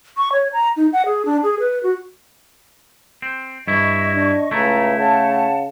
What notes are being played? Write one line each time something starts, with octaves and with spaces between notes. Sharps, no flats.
C#6
C#5
A#5
D#4
F#5
G#4
D4
G#4
B4
F#4
C4
G2 E4 D#5 C#6
D4
C#2 A3 E4 A#5
C#3 F#5 A5